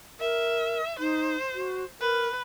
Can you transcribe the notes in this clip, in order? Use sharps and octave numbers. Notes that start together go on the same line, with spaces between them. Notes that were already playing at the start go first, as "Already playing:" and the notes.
A#4 E5
D#4 C5
F#4
A#4 B4